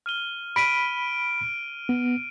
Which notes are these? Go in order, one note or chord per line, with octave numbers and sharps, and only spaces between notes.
F6 D#7 G7
B5 B6 D7 D#7
B3